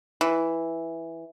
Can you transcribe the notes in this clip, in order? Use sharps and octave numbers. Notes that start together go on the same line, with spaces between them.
E3